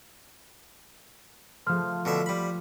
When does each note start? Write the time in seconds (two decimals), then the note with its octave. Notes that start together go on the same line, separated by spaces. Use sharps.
1.66 F3 A3 C6 F6
2.05 B2 D3 E5
2.26 G3 B5